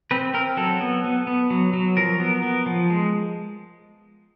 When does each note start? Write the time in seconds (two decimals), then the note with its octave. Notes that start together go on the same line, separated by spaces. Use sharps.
0.11 C4 B4
0.34 C4 A#4
0.57 F#3 A4
0.81 B3
1.04 B3
1.27 B3
1.50 F#3
1.73 F#3
1.97 F3 A#4
2.20 B3
2.43 B3
2.66 F3
2.90 G#3